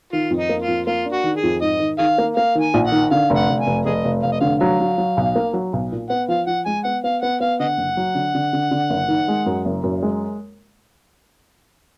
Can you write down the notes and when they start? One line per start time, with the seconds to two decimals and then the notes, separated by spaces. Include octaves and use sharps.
0.13 D#3 F4
0.30 F2
0.37 D#4
0.49 A#3
0.62 F4
0.68 F2
0.86 A#3 F4
1.05 D4
1.12 F#4
1.24 D#3
1.37 G#4
1.43 F2
1.62 G#2 D#5
1.80 D#3
1.99 D#3 G#4 F5
2.18 A#3
2.37 A#3 F5
2.55 D#3
2.61 G#5
2.74 A#1
2.87 F#5
2.92 D#3
3.11 D3 F5
3.30 F1
3.36 F#5
3.49 F1
3.60 G#5
3.67 F1
3.86 F1 G#4 D#5
4.05 F1
4.23 F1 F5
4.32 D#5
4.41 D3 F5
4.60 F#3 F5
4.80 F#3
4.98 F#3
5.17 B1
5.36 A#3
5.53 F#3
5.73 B1
5.92 A#2
6.09 B3 F#5
6.28 F3 F5
6.47 F3 F#5
6.65 G#3 G#5
6.84 B3 F#5
7.04 B3 F5
7.22 B3 F#5
7.40 B3 F5
7.60 D3 D#5 F#5
7.78 F#1
7.97 F#3
8.15 D3
8.35 D3
8.53 D3
8.71 D3
8.90 F#1
9.08 D#3
9.28 G#3
9.46 F#2
9.65 F#1
9.83 F#2
10.02 G#3